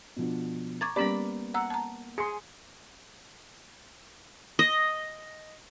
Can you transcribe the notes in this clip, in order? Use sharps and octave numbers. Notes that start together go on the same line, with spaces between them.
B2 F3 D4
A#5 C#6 D6 G#6 A6
G3 A#3 B3 C#4 G4 D5 A#5 B5
F#5 A#5 E6
A5 A#5
G#4 C6 C#7
D#5